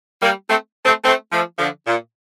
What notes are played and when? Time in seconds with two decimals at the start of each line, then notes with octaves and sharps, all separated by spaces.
0.21 G3 A#3
0.49 A3 C4
0.85 A3 C4
1.03 A3 C4
1.32 F3 A3
1.58 D3 F3
1.87 A#2